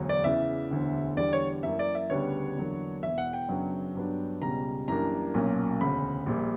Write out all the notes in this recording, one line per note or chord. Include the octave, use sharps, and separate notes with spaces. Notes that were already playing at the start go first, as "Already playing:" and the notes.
Already playing: E1 D2 F#3
D5
E2 C#3 E3 E5
E1 D2 D3
E2 D3 G3 D5
C#5
F#2 E3 A#3 E5
D5
E5
D2 C#3 G3 B3 D4 C#5
E2 D3 F#3 A#3 D4
E1 E2 B2 E5
F#5
G5
F#2 C#3 F#3 B3 D4
G2 F#3 B3 D4
C#2 B2 G3 C#4 A#5
F#2 E3 G3 A#3 D4 A#5
B1 A#2 F#3 A#3 C#4
E1 D2 C#3 B5
A#1 A#2 G3